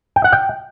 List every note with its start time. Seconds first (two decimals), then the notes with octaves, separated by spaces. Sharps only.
0.16 G5
0.24 F#5
0.32 G5